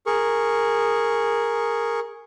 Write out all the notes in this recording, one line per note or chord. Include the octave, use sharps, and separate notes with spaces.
G#4 A#4 C#6